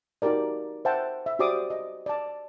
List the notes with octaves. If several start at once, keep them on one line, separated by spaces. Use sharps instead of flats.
D#4 F#4 G4 A#4 D5
C5 E5 F#5 G5 A5
E5
F#4 G4 C5 D5 D6 D#6
D#5
D5 A5